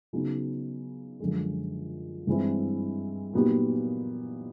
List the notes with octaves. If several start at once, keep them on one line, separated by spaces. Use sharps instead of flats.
C#3 F#3 B3 D#4
F#2 D3 F3 G#3
G2 E3 G#3 C4 E4
A#2 F#3 B3 D#4 G4